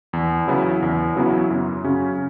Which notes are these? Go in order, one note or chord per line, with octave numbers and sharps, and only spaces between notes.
E2
C#3 F#3 B3 E4
E2
C#3 F#3 B3 E4
F#2
C#3 F#3 C#4